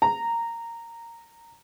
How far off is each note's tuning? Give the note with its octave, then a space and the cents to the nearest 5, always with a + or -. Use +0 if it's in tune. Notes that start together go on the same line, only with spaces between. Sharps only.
A#5 -10